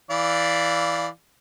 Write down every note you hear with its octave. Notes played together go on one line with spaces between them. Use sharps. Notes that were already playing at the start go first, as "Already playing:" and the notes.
E3 D5 F5